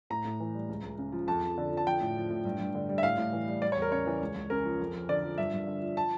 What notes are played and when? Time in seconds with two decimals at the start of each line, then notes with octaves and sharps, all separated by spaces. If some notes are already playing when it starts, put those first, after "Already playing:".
0.10 A2 A#5
0.25 A2
0.40 E3
0.55 G3
0.69 C#2
0.83 C#2
0.98 C#3
1.12 F3
1.27 F2 A5
1.43 F2
1.58 D3
1.72 F3
1.77 A5
1.86 F3 G5
2.01 A2
2.16 F3
2.30 A2
2.45 G2
2.60 G2
2.75 D3
2.89 G3
2.98 E5
3.03 A2 F5
3.18 A2
3.33 E3
3.47 G3
3.62 G3 D5
3.72 C#5
3.76 E2
3.82 A#4
3.92 C#3 C#5
4.07 E3
4.21 C#2
4.35 C#2
4.50 C#3 A#4
4.65 F3
4.80 F2
4.94 F2
5.09 D3 D5
5.24 F3
5.38 G2 E5
5.54 G2
5.67 D3
5.82 F3
5.97 A5